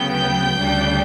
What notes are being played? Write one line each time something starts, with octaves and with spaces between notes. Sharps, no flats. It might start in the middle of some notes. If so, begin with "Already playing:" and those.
Already playing: D2 C#3 F#3 B3 G5 G6
D2 C#3 G3 D4